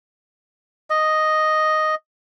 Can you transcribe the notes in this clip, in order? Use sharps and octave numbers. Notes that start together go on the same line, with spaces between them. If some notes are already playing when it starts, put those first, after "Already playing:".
D#5